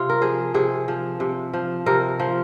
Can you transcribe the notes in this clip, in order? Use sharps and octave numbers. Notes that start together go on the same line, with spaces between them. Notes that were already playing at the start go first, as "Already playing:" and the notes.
Already playing: C3 F4
A#4
F3 G#4
C3 G#4
F3
C3
F3
C3 A#4
F3